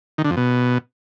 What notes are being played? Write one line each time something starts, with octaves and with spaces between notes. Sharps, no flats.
D#3
D3
F2
B2